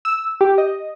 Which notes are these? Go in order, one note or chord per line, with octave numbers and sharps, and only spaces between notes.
E6
G4
D#5